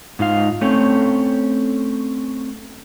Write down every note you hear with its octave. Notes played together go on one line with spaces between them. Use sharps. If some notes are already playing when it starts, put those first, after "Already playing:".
G#2 D#4 F4 F5
A3 C4 C#4 A4 C#5